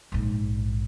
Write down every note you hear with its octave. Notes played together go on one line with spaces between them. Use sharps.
A#1 G#2